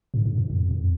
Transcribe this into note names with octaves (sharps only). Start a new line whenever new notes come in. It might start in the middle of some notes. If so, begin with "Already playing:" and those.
G#2
G2
F#2
F2
F2